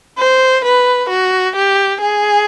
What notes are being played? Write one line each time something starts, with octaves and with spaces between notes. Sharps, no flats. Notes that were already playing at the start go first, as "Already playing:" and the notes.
C5
B4
F#4
G4
G#4